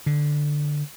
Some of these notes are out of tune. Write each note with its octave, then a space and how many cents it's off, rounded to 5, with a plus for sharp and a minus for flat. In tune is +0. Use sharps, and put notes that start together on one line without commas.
D3 +0